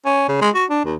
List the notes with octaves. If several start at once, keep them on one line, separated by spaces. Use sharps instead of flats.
C#4
C#3
G#3
F#4
D4
D#2